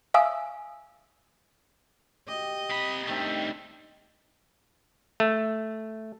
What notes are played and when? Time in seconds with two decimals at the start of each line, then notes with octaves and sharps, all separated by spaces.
0.14 E5 F5 G#5 D#6 E6
2.28 G4 D#5
2.70 C3 B5
3.08 D#3 G3 A3 C4 D4
5.20 A3